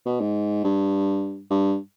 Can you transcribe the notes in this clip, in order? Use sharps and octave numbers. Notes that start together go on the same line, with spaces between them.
B2
G#2
G2
G2